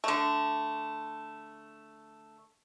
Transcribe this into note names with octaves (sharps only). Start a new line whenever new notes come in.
D3 A3